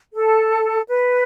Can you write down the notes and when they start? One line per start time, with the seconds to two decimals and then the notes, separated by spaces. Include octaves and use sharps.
0.13 A4
0.88 B4